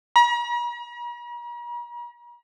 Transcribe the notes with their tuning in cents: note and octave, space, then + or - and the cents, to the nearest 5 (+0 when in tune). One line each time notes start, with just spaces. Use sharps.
A#5 +45